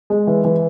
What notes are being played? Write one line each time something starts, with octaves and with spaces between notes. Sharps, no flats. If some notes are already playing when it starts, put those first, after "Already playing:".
G#3
E3
E3